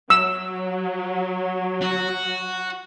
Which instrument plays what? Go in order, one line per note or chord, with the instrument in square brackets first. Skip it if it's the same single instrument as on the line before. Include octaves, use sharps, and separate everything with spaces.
[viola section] F#3 [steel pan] E6
[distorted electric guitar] F#4